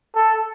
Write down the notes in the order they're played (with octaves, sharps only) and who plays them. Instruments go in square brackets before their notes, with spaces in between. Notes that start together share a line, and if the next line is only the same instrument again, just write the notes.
[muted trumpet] A4